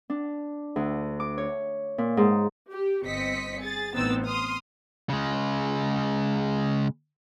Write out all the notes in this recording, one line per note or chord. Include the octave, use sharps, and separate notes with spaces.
D4
D2
D6
C#5
A#2
G#2
G4
G1 C4 D#5 B6 C#7
G#4 A6
A1 B3 C4 D#4 E6 A6
C6 D#6 F6
C#3 G#3